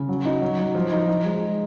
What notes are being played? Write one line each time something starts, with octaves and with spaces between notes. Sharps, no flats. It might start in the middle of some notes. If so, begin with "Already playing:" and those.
Already playing: C#3
F#3
D#4
F#3
F#3
F3
D#4
D#4
G#3